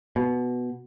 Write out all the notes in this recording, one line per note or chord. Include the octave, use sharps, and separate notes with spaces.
B2